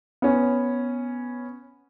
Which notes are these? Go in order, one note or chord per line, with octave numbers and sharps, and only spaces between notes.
B3 C#4